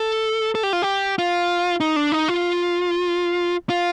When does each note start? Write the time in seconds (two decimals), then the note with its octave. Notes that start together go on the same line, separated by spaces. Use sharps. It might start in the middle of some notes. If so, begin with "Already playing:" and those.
Already playing: A4
0.55 A4
0.63 G4
0.73 F4
0.82 G4
1.18 F4
1.80 D#4
1.96 D4
2.12 D#4
2.28 F4
3.69 F4